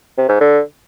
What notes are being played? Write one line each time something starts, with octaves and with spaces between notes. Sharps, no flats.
C3
G#2
D3